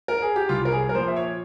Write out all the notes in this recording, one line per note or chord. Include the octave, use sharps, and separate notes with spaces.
A#4
G#4
G4
C2 F4
A#4
G#4
A#4
A#2 F3 C5
E5
C#5